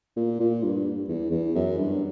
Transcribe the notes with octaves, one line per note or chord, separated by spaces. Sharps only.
A#2
A#2
G2
E2
E2
F#2
G2